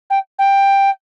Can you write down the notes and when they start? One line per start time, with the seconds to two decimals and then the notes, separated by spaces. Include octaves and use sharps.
0.10 G5
0.39 G5